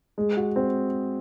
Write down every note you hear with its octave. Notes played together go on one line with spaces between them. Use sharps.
G#3
F#4
C4